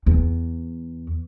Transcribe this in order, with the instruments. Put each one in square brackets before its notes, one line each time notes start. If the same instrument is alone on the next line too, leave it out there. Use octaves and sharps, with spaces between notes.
[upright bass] E2